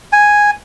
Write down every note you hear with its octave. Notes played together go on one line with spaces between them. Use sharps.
G#5